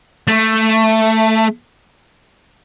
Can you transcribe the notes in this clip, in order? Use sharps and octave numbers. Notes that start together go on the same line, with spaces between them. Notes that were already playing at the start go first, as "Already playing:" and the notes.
A3